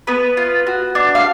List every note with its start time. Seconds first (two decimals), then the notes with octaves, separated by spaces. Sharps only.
0.07 B3 B4
0.37 F4
0.67 F#4
0.95 D4
1.15 F5